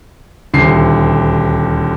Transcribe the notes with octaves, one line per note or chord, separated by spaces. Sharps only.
D#1 D2 C7